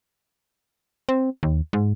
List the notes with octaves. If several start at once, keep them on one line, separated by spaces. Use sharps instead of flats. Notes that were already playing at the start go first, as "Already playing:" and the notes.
C4
D#2
G#2